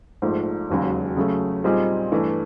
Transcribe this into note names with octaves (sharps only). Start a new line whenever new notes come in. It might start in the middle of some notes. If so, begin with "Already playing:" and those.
A#1 G#2 F3 A3
E1 D#2 C#3 F#3
C#3 F#3 A3
A#2 G3 C4 D#4 G#4
G2 E3 A3